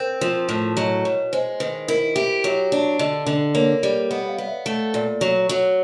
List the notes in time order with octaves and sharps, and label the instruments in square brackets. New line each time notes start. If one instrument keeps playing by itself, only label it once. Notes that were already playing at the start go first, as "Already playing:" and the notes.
Already playing: [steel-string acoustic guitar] C4 [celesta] A#4
[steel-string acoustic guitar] F3
A2
[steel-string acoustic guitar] F#3 [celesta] D#5
[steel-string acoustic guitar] B2 [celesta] C#5
[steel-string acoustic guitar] G#3 [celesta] C5
[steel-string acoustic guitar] D#3 [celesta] B4
[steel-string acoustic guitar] E4 [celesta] A#4
[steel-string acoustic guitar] G4 [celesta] E5
[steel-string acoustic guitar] F#3
D4
[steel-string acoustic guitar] D3 [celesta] D#5
[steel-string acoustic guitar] D3 [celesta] D5
[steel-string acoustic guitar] A#3 [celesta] C#5
[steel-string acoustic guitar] G3 [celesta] D5
[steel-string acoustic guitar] B3 [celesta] D#5
[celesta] F5
[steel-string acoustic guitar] B3
[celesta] E5
[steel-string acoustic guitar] A3
A#2
F#3
F#3